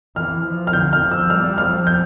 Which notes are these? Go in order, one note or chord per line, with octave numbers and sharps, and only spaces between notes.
E3 F6
F3
F6
D3 G6
F6
F3
E6
G3 F6
F3 F6
G6